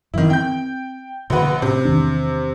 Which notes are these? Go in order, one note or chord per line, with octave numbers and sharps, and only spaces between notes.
F#2 D#3 E3 C4 E4
C4 G5 G6
A#1 B2 D3 F#4 B4
A2 C3
E2 D#3 D4